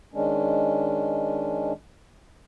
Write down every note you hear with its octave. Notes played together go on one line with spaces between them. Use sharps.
D#3 G#3 C#4 D4